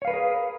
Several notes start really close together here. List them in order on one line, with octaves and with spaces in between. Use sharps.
C#5 F5 B4 A#4 G#4